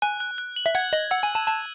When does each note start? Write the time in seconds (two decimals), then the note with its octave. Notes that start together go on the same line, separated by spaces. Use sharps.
0.02 G#5 F#6
0.20 F#6
0.38 F#6
0.56 F#7
0.66 E5
0.75 F#5 G#6
0.93 D#5 F#7
1.11 F#5 E6
1.23 G#5
1.30 D#7
1.35 A5
1.47 A5 F#6